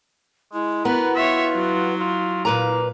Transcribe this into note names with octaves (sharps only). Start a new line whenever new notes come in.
G#3 E4
B3 F#4 A#4 B4
F4 C#5 E5
F#3
F4
A#2 A#3 B4 A#5